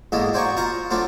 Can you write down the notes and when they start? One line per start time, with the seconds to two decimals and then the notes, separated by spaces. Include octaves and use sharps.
0.12 E2 G#2 G#3 A#3 F#4 A4
0.33 F#4 C5 D5 G#5 A#5 C#6
0.57 F4 C5 A#5 C#6 D#6
0.90 F#3 A3 C4 D4 F4 F#4